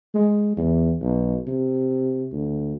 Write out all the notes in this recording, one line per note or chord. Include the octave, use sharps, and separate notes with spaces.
G#3
E2
B1
C3
D2